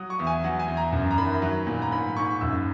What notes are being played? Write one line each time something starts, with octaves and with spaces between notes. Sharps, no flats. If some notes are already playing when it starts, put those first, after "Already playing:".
Already playing: F#3 D#6
C#6
E2
G#5
F#3 F#5
G#5
E2
A#5
F#2
A#5
D#3 B5
F#3
A#2
A#5
G#2 B5
G#2 C#6
F#2 E6